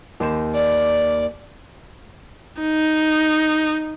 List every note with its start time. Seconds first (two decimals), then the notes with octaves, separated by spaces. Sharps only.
0.20 D#2 C5 E7
0.55 D5
2.61 D#4